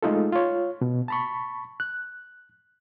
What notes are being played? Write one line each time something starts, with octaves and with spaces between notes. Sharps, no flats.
G#3 A3 D#4 F4 A4
F4 C#5
B2
A5 B5 C#6
F#6